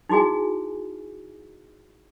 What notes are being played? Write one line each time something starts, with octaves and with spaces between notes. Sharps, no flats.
D#4 E4 F#4 G#4 G#5